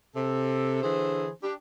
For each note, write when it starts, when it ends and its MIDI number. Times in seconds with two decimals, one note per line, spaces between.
0.16 0.82 48
0.16 0.82 69
0.83 1.29 50
0.83 1.29 52
0.83 1.29 68
0.83 1.29 72
1.44 1.53 62
1.44 1.53 67